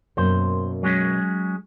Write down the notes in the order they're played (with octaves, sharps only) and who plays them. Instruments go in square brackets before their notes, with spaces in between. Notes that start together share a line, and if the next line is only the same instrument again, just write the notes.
[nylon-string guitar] F#2 B2 A#3 [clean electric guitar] C5
[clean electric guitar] F#3 G#3 C#4